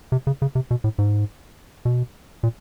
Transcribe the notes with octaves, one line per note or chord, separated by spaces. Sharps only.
C3
C#3
C#3
C3
B2
A2
G#2
B2
A#2